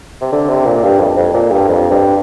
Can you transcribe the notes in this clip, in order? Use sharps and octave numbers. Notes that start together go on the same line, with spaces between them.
C3
D3
C3
A#2
G2
F2
F2
A#2
G2
F2
G2